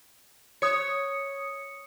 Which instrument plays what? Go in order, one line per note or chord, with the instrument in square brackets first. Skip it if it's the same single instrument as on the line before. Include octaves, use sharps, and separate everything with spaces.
[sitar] C#5 [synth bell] D#6 C#7